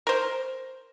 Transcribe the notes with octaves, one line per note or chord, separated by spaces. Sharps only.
A#4 C5